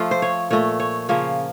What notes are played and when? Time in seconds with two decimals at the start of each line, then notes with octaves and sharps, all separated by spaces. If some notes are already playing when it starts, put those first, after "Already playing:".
Already playing: F3 A3 F4
0.11 C5
0.22 C#5
0.51 A#2 A3 C#5
0.80 C#5
1.09 C#3 F3 A#3 C#5